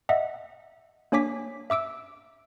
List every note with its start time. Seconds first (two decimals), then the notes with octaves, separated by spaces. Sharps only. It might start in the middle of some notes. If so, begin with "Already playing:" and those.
0.09 D#5 E5 F#5
1.12 A#3 D4 C#5 G#5 D6 B6
1.70 E5 D6 E6 D7